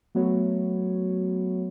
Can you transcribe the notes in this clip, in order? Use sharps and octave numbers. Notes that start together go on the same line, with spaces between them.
F#3 A3 B3 F#4 C#5